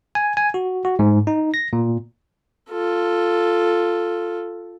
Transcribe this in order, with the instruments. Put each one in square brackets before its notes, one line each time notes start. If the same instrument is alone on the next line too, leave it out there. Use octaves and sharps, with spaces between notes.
[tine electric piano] G#5
G#5
F#4
F#4
G#2
D#4
A#6
A#2
[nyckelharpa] F4 A4